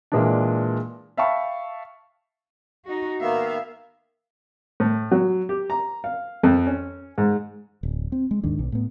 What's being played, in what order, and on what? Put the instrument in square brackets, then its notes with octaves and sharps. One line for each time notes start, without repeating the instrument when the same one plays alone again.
[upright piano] A#2 E3 G#3 A#3 D4
E5 F5 G5 A5 B5 C#6
[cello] D#4 F#4
[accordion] D#3 A#3 B3 [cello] E5 F5
[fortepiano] A2
F#3
G4
A#5
F5
F2
C#4
G#2
[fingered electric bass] D1
C4
G#3
D#2 G#2 D#3 D4
B1
A2 B3